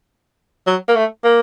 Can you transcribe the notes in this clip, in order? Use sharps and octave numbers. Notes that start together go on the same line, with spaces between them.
F#3
A#3
A3
A#3